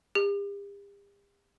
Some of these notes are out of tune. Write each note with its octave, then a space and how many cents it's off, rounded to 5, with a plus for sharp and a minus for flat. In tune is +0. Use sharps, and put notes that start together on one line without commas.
G4 +40